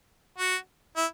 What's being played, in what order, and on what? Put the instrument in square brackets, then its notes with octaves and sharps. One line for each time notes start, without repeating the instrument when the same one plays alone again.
[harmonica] F#4
E4